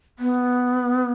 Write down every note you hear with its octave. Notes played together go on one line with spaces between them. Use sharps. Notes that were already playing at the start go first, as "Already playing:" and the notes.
B3